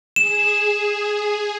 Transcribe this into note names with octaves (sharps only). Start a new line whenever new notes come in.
G#4 E7